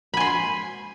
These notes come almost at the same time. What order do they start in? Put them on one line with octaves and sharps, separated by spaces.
B5 G#5 C6